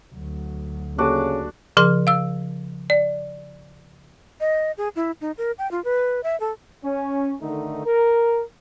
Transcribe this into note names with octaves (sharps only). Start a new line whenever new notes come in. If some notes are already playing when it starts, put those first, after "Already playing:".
D2 F#3
C#3 A#3 D4 F#4 G4 A4 D5
C#3 F3 G#4 C6 F6
F5 E6
D5
D#5
G#4
E4
D#4
A#4
G5
F4
B4
E5
A4
C#4
D3 D#3 A3 D#4
A#4